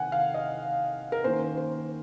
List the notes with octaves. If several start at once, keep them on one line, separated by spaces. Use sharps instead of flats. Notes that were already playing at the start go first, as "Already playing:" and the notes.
Already playing: C3 D#3 F#5 G#5
F5
D#5
A#4
D#3 A#3 C#4 C5
C5